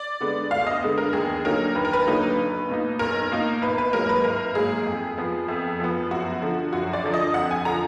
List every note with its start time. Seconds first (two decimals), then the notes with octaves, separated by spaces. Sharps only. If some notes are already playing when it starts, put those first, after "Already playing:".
Already playing: D5
0.21 D3 G#3 B3
0.51 D2 F5
0.67 D#5
0.82 D3 G#3 B3
0.98 A#4
1.13 D#2 G#4
1.45 D3 F#3 A#3 D#4 A#4
1.75 D#2 B4
1.85 A#4
1.93 B4
2.07 D3 F#3 A#3 D#4
2.38 B1
2.69 B2 A#3 D#4
2.99 B1 A#4
3.31 B2 A#3 D#4
3.62 G#1 B4
3.78 B4
3.93 G#2 F#3 A#3 A#4
4.09 B4
4.24 G#1 A#4
4.55 G#2 F#3 A#3 G#4
4.87 F2
5.18 F3 B3
5.48 F2
5.80 F3 B3
6.11 F#2 F#4
6.42 D3 F3
6.73 F#2 F#4
6.93 D5
7.04 D3 F3
7.14 D#5
7.34 F2 F#5
7.51 G#5
7.65 D3 F3 A#5